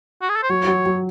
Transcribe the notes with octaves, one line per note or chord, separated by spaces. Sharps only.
F#4
G#4
A4
C5
F#3 C#5
F#3
F#3